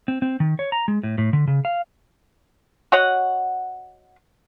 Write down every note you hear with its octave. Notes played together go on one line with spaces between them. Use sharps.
C4
C4
D#3
C#5
A#5
G#3
A2
A2
D3
C#3
F5
F#4 C#5 D#5 F#5